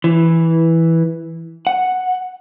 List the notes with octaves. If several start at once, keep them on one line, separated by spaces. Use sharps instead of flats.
E3
F#5